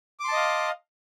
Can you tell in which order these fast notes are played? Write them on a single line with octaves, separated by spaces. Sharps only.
D6 C6 A5 D#5 F5